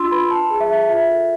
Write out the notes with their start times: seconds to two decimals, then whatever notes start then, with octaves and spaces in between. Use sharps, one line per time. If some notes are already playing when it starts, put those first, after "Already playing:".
Already playing: D4 F4 C6 E6
0.11 B4 B5
0.31 D4 A5
0.50 G#4
0.60 E5
0.69 D4
0.89 F4 E5
1.09 A4